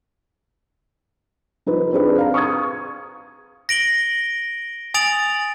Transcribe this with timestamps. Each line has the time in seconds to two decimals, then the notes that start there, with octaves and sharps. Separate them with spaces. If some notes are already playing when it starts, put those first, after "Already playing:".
1.66 F3 D#4 B4 C5
1.93 C4 D4 G#4 B4 D5
2.18 F5 A#5
2.34 C#6 D#6 G#6
3.69 A#6 D7 F#7 G7
4.94 G#5 D#6 A6 D7 F7 F#7